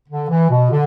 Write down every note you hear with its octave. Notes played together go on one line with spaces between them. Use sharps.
D3
E3
B2
D3